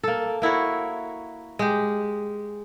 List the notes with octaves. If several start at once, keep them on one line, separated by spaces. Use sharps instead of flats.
A#3 A4
A#3 E4 F#4 C#5
G#3 G4